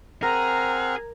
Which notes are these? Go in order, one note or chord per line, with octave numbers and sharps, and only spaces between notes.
C4 G#4 A#4 F#5 A#5 F6